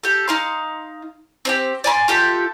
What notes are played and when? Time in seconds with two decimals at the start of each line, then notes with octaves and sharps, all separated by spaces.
0.03 G4 A4
0.28 D#4 F5 C6
1.45 C4 D4 G4
1.84 D5 G#5 B5 C6
2.08 F4 G4 A4 E5